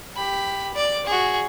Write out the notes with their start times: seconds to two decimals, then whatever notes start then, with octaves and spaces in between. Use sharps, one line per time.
0.16 G4 B5
0.74 D5 D6
1.06 F#4 G#4